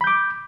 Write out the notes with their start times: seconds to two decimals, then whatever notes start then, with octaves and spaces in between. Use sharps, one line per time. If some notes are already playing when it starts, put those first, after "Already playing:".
0.01 B5
0.04 G6
0.07 D6